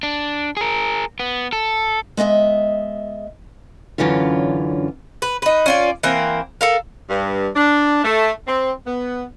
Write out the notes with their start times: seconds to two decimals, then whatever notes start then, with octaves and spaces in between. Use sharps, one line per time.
0.03 D4
0.57 G#4 A#4
1.20 B3
1.53 A4
2.17 G#3 B3 D#5 E5
3.98 F#2 D3 E3 C#4 F4
5.22 B4
5.42 D#4 B4
5.66 C#4 F4 D5
6.03 E3 A#3 C4 A#4
6.61 A4 A#4 F5
7.10 G2
7.56 D4
8.04 A3
8.47 C4
8.86 B3